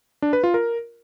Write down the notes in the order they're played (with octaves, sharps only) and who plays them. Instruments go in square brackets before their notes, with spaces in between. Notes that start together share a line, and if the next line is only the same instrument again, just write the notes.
[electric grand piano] D4
B4
F4
A#4